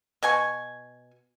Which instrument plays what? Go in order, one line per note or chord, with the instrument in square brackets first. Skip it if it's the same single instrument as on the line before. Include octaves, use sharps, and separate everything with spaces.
[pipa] B2 G#5 C#6